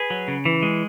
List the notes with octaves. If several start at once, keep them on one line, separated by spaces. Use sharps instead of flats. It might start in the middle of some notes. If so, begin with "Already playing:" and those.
Already playing: G#4 B4
F#3
C#3
E3
G#3